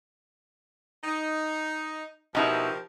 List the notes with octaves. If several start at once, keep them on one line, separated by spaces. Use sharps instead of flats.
D#4
B2 F3 D#4 E4 G4 A#4